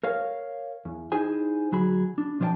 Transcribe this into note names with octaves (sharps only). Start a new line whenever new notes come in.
A#4 C#5 F5
E2
D#4 E4 G#4 C5 G#5
D2 F#3 G#4 B5
D4
B1 F3 D4 C#5 G5 A5